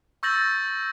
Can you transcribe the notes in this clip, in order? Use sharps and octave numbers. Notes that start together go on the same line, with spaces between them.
C#6 E6 G6 A6 A#6 F#7